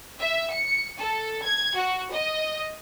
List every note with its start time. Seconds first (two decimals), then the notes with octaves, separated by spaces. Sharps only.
0.20 E5
0.55 C#7
0.99 A4
1.45 G#6
1.78 F#4
2.13 D#5